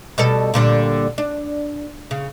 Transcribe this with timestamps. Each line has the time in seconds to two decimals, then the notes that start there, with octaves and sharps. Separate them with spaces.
0.18 B2 G3 A4
0.54 A#2 D3 G3
1.18 D4
2.11 C#3